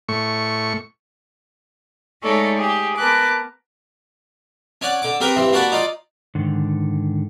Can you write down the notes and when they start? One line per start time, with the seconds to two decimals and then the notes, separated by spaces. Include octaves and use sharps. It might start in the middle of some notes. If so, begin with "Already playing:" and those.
0.09 A2 C#6
2.22 G#3 A3 D#4 A4 C#5 D5
2.56 G4 G#4
2.97 B3 A#4 B4 A5 D6 F#6
4.81 C#4 C#5 D5 F#5
5.02 D3 D6
5.20 C4 G4 A#4 B4
5.36 G2 E3 C4
5.53 A#3 F#4 D5 F#5 A5 B5
5.72 D#4 F4 D5
6.35 G#2 D3 D#3